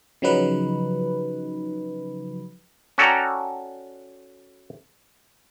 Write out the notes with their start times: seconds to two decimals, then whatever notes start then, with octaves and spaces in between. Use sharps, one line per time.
0.22 C#3 F3 F#3 D#4 B4
2.98 C#4 F#4 A4 D5 G5 A#5